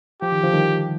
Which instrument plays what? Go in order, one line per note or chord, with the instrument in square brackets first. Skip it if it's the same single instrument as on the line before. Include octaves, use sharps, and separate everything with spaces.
[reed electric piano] F3 [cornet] G4
[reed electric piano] D#3
D3 F3
D#3 G3